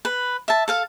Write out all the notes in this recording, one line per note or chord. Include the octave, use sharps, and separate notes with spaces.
B4
E5 A5
A4 F5 A5